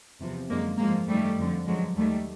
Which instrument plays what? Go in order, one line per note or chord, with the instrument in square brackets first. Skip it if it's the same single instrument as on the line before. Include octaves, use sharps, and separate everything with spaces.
[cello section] E2 C3 F3
F#2 D3 F3 G#3 A#3
G#2 F3 G#3 A#3
F#2 D#3 G3 A3
F2 D3 F3
G2 D3 F3 F#3 G#3
D#2 D#3 G3 A3